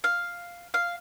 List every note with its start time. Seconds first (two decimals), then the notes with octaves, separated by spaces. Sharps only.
0.04 F5
0.74 F5